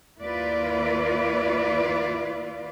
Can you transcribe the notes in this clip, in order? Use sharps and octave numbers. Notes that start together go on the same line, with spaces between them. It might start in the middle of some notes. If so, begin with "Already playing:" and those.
D#2 A#3 E4 F4 B4 D5